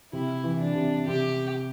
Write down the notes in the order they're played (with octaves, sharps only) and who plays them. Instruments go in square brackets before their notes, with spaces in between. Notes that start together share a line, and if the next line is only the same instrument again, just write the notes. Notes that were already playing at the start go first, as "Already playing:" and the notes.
[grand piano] C3 [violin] E4
[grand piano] E3
[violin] D4
[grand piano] C3
[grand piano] C3 [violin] G4